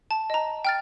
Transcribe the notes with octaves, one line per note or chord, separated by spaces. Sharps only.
A5
D#5 A#5
G5 F6 A6